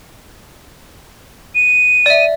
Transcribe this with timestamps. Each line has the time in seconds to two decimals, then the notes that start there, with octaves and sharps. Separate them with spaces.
1.55 D#7
2.06 D5 E5